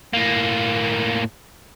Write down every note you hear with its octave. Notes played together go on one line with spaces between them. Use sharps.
A2 A#3